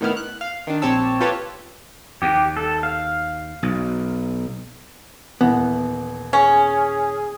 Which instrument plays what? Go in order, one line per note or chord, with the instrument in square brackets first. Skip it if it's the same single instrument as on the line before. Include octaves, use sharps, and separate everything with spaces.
[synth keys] A2 D#3 B3 E4 F6
F#6
F5
D#3 D4
A#1 C4 G4 C#5 A5 E6
F4 G4 A4 B4 C#5 A5
[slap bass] D#2 [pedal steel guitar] G4
[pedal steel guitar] A4
F5
[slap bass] B1
[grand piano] D#1 E3 [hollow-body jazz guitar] B3
[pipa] C#4 [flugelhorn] G#4